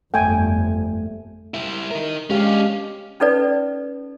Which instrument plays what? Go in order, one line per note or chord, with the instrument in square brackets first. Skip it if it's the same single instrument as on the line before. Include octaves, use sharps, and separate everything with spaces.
[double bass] G1 F2 [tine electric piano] A3 [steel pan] G5 G#5
[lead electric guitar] G3 E4
D#4 A#4
[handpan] G#3 G4 F5 [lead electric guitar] C#4 D4
[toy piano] C#4 D#4 A4 B4 D5